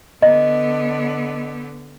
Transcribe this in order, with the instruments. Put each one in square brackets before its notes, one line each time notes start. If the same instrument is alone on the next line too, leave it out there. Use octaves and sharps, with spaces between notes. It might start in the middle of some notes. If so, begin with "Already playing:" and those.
[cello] D3 B3 [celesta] D#5